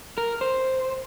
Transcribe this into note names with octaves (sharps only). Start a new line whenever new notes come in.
A#4
C5